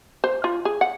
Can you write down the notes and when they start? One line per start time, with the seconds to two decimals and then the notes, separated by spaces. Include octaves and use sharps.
0.24 C5
0.44 F4
0.65 G#4
0.81 F#5